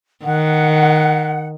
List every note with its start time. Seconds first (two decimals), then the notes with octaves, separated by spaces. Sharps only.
0.25 D#3 F#5